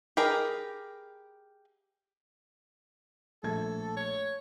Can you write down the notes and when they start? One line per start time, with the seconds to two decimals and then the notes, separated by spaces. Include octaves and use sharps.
0.17 G4 G#4 A#4 B4 D#5
3.43 A#1 A3 A4 G#6
3.97 C#5